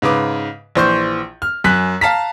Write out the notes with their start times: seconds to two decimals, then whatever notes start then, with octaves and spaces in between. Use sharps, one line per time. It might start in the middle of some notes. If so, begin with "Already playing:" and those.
0.02 G#2 C#3 B4 D6
0.75 A#1 E3 C5 C6 C#6 G6
1.42 F6
1.64 F#2 G#5 F#6 B6
2.01 F5 A5 A#5 B6